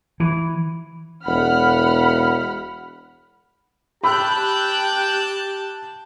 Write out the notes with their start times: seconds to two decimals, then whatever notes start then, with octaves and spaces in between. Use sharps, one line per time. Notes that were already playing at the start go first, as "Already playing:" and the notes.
0.20 E3
1.26 E1 F#5 B5 F6
4.03 G4 G5 A5 B5 E6 F#6 G6